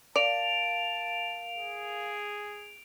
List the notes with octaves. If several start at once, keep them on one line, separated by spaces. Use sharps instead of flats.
A#4 D5 F5 A5 D7 F7
G#4